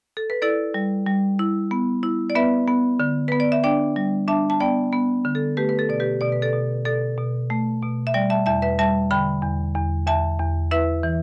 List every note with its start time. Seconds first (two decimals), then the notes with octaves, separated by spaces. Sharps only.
0.17 A4
0.30 B4
0.42 E4 A4 D5
0.74 G3
1.07 G3
1.39 E4
1.71 B3
2.03 E4
2.30 D5
2.35 B3 B4 E5
2.67 B3
3.00 D3
3.28 B3 B4
3.40 D5
3.52 E5
3.64 D4 D5 G5
3.96 G3
4.28 D4 E5 A5
4.50 A5
4.60 B3 D5 G5
4.92 B3
5.25 D3
5.35 A4
5.57 A3 G4 B4
5.69 B4
5.79 A4
5.89 B2 D5
6.00 G4 B4
6.21 B2 D5
6.32 B4
6.42 A4 D5
6.53 B2
6.85 B2 A4 D5
7.18 B2
7.50 A3
7.82 B2
8.07 E5
8.14 G3 D5 G5
8.30 E5 A5
8.46 E2 E5 A5
8.62 B4 E5
8.79 G3 E5 A5
9.11 D3 G5 B5
9.43 E2
9.75 E2
10.07 E2 E5 A5
10.39 E2
10.71 E4 B4 E5
11.03 E3